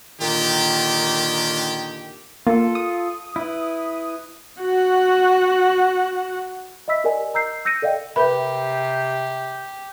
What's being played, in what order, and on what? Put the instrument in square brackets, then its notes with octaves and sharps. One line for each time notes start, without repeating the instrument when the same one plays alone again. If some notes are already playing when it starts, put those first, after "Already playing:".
[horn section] A#2 D3 D#3 G4
[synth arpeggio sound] A#3 [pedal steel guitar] F4 A4
[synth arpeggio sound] D#6
[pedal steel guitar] E4 B4
[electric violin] F#4 F#5
[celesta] D#5 E5 B5 E6 B6
G4 A#4 D5 D#5 G#5
D#5 A#5 E6 G6 C7
E6 G6 A#6 C#7 D#7
A4 D5 D#5 F5 G5
[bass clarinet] C3 [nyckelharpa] G4 [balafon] A#4 B4 E5 [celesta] B5